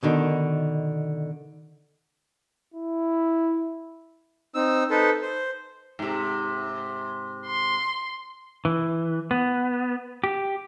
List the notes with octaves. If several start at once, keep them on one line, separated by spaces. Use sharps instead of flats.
B2 D3 D#3
E4
C4 D#4 E6
D#4 A4 B4 C5
C5
G#2 C3
C6
E3
B3
G4